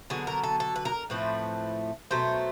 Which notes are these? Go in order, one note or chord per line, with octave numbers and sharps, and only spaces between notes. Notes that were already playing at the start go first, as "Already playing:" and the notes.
D3 F#3 B3 G#4
A#4
A4
A4
B4
A#4
A2 F3 A3 C4 B4
B2 F#3 A3 C5